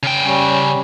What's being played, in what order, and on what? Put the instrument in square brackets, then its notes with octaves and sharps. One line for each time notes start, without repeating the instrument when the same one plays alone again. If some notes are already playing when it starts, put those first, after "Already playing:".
[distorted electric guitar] C#3 G5
[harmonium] G3 C#4